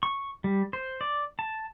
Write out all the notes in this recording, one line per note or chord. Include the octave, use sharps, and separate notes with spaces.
C#6
G3
C5
D5
A5